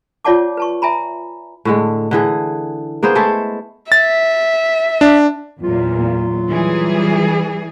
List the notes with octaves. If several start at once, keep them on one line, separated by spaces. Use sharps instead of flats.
F4 C#5 D5 F#5 A5 D6
B4 A5 C#6
E5 G#5 A#5 B5
A2 D3 G#3
D3 E3 G#4
A#3 B3 G#4 C5
G#3 A3 E4 A4
E5 A6
D4
E2 A#2 F#3 F4
E3 G3 G#4